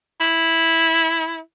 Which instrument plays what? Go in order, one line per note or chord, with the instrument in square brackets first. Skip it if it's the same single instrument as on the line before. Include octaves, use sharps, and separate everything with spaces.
[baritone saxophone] E4